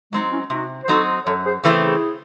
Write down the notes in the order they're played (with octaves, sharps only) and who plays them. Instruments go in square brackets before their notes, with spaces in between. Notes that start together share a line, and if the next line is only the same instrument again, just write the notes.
[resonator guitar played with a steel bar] F#3 C4 D#4 [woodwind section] G#3
[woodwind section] C#4 E4
[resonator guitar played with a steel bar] C3 [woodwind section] D#4 F#4
[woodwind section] C5
[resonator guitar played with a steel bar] F#3 C4 D#4 [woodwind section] F#4 A4
[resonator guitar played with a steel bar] F#2 [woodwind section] A4 C#5
[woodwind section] G#4 C5
[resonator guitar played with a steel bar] C#3 E3 A3 C4 [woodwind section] E4 G#4
[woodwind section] E4 G#4